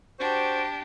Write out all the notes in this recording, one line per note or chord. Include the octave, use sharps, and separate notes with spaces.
D4 F#4 G4 C5